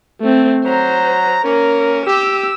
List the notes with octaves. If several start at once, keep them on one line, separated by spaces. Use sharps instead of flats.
A3 C4
F#3 C5 A#5
A#3 C#4 A#4
G4 E6